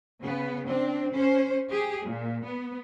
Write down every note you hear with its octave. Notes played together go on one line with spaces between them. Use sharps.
C#3 B3
C4 D4
C#4 C5
G4 G#4
A#2
B3